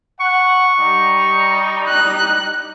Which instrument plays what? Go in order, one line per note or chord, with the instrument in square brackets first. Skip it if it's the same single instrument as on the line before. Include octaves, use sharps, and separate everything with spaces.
[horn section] F#5 [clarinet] C#6
[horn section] G3 D#4
[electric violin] F#6